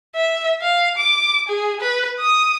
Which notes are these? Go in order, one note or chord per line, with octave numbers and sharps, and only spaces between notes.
E5
F5
D6
G#4
B4
D#6